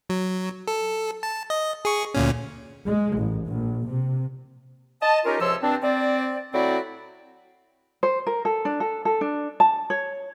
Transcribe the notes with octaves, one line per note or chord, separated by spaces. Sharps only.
F#3
A4
A5
D#5
G#4 C#6
D2 A#2 C#4
G#3
A1
A#1
C3
D#5 A5
C#4 D#4 F4 G4 A#4
C#2 C3 F3 C#5 C6 E6
G2 C4 D4
C4 D5
A2 F#3 C4 E4 F#4 D5
C5
A#4
A4
D4
A4
A4
D4
A5
C#5